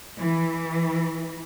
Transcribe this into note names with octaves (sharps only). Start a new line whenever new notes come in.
E3